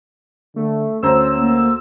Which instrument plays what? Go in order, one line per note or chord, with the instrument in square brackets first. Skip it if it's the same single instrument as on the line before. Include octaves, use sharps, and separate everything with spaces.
[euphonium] D3 [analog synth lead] A3
[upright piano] D2 C5 A#5 [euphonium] C#4 [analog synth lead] E6
[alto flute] A#3